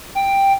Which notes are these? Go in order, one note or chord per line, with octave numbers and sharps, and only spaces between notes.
G5